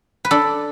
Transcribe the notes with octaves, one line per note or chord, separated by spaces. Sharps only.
B4
D4 A4